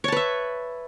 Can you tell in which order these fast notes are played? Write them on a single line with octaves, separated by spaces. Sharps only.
C#5 A5 B4 E5